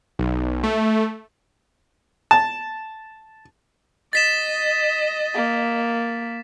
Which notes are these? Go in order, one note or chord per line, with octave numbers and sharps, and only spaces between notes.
B1
A3
A5
D#5 A6 B6 E7
A#3